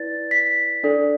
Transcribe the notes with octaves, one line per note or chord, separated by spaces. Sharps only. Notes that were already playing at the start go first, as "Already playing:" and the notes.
Already playing: E4 B4 D5 A6
B6
D4 A4 D5